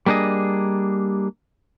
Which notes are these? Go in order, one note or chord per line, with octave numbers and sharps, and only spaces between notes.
G3 A#3 D4 G#4 D#5